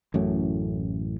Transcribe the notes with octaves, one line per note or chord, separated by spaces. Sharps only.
A1 F#2 A2